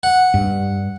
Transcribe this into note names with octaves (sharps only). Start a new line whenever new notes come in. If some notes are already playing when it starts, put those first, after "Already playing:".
F#5
G2